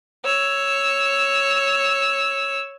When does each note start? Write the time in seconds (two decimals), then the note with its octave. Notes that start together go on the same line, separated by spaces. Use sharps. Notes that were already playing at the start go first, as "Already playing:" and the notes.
0.25 C#5 E6